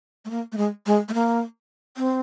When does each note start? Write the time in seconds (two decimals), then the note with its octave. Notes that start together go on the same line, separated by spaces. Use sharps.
0.25 A3
0.30 A#3
0.52 A3
0.57 G#3
0.86 G#3
1.08 A3
1.14 A#3
1.97 C4